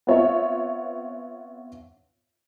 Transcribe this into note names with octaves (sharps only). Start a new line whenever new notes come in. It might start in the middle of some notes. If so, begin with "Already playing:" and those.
B3 C4 F4 C#5 E5